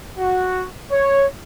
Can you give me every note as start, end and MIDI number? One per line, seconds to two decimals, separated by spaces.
0.18 0.65 66
0.91 1.25 73